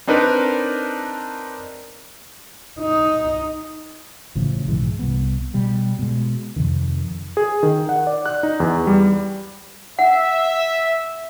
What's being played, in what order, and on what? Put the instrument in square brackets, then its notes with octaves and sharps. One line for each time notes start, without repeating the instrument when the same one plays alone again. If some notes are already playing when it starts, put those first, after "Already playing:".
[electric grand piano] C4 D4 D#4 A#4 B4
[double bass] D#4
[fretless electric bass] A1 A2 C#3 F3
B1 G#2 E3 G#3
C2 B3
B2 G3
B2 G#3
F2 C3 D#3
[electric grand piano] G#4
D#3
F#5
D5
F#6
D#4
E2
G3
[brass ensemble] E5 [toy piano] F#5